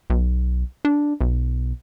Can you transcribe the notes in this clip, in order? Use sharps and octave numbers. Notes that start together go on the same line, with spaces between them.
B1
D4
B1